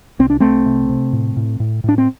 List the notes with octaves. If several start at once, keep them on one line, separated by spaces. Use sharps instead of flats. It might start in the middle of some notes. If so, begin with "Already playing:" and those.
C2 C4
D4
C2 A3 C4
C3
C3
A2
A2
A2
A2 D4
C4